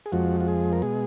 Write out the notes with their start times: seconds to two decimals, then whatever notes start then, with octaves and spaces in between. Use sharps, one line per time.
0.06 G#4
0.12 F2 F3 G#3 F#4
0.41 F#4
0.48 G#4
0.73 A#4
0.82 B2 G#3 G#4